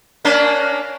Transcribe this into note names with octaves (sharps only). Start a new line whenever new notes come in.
A#3 C#4 D4